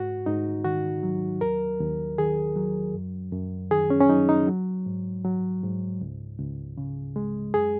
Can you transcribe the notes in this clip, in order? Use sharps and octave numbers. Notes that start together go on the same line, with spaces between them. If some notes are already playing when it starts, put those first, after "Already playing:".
Already playing: G#2 F#4
G#2 D#4
D#3 F#4
F#3
D#2 A#4
D#2
D#3 G#4
F#3
F#2
F#2
D#3 G#4
C#4
C#4
F#3 D#4
D#4
F#3
G#2
F#3
G#2
C#2
C#2
C#3
G#3
F#2 G#4